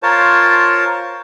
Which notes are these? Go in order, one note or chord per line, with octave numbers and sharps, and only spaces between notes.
F4 A#4 C5 C#5 A5